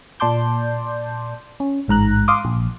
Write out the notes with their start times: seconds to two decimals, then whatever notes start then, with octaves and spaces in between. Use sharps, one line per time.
0.20 A#2 D5 A5 C6 D6 G6
1.60 C#4
1.88 A1 G#2 A#5 F#6
2.28 F5 C6 D6 D#6
2.45 A#1